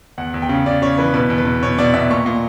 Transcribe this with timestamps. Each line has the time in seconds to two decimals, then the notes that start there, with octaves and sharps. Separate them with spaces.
0.18 E2 F#5
0.34 E2
0.42 G5
0.49 C#3
0.66 C#3 D5
0.82 C#3 C#5
0.98 E3 B4
1.14 B2 B4
1.30 E2
1.38 B4
1.45 B2
1.63 B2 C#5
1.78 B2 D5
1.94 B2 E5
2.10 A#2 C#6
2.26 A#2